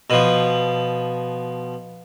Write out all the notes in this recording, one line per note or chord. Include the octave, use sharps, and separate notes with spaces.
B2 F3